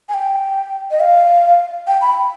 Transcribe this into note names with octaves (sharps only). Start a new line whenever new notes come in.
G#5
G5
D#5
F5
G5
B5